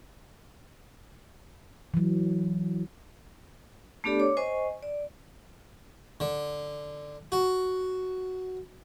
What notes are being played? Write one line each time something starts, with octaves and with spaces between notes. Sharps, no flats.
E3 F#3
A3 B3 D4 G4 A4 D5
C#5 D6
C5 D#5 G#5 C#6
D5
D3
F#4